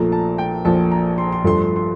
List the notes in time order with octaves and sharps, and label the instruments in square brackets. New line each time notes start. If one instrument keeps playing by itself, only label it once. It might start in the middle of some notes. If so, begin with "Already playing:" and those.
Already playing: [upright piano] A#1 A#2 F3 A3 A#5
A5
G5
A#1 A#2 F3 A3 A5
A#5
C6
C6
G2 F3 A3 C6
C6
C6